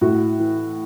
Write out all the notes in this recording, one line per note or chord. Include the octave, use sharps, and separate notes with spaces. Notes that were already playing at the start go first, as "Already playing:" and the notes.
A2 F#4
E3